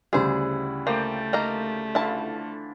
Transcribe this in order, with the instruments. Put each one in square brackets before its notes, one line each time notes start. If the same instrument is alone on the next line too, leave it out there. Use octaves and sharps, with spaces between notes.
[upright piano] D2 C#3 G3 [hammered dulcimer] E4 F#5 [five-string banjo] G#4 C5
[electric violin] A3 [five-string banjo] A#3 [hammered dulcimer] C5 D5 G5
[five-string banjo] A#3 D#4 A#4
[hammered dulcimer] D3 E3 F4 [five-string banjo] E4 A5